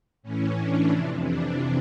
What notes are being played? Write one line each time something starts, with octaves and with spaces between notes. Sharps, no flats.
A2 E3 C#4
D4
F2 C3 E3 D4
D4